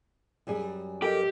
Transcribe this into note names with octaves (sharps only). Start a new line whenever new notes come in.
F#2 G3 G#4
G4 A4 A#4 D#5